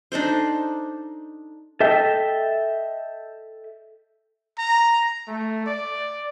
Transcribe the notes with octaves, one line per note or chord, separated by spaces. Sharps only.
D4 D#4 A4 C5
A4 D#5 E5 G5
A#5
A3
D5